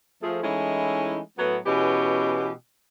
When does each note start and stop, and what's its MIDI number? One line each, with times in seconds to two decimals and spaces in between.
0.22 0.41 53
0.22 0.41 57
0.22 0.41 68
0.42 1.19 52
0.42 1.19 56
0.42 1.19 57
0.42 1.19 61
0.42 1.19 63
0.42 1.19 64
1.38 1.56 45
1.38 1.56 54
1.38 1.56 57
1.38 1.56 59
1.65 2.50 47
1.65 2.50 52
1.65 2.50 56
1.65 2.50 59
1.65 2.50 61
1.65 2.50 67